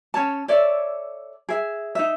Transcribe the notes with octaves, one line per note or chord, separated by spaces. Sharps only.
C#4 C#5 A5
A4 C#5 D5 E5
G#4 E5
D#4 E5